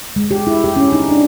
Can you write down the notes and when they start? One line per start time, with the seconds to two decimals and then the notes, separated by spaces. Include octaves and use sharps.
0.16 G#3
0.31 G4
0.47 E4
0.64 G4
0.76 C#4
0.92 D#4
1.08 D4